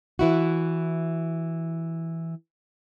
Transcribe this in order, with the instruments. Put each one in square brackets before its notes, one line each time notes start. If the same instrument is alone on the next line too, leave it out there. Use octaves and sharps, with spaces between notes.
[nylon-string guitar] E3 E4 F#4